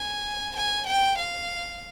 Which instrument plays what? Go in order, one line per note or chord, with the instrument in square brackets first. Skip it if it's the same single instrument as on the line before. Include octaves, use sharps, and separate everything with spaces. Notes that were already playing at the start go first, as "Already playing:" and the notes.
Already playing: [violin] G#5
G#5
G5
F5